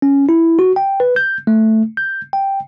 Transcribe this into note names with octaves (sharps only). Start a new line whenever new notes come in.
C#4
E4
F#4
G5
B4
G6
A3
G6
G5